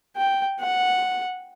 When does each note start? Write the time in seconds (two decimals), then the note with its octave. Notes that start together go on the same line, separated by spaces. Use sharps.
0.17 G5
0.60 F#5